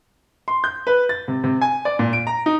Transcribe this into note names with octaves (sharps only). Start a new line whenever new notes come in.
C6
G6
B4
A6
C3
C3
G#5
D5
A#2
D7
A#5
D#4